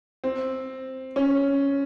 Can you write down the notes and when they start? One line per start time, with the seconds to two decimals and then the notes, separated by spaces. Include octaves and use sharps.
0.24 C4
1.16 C#4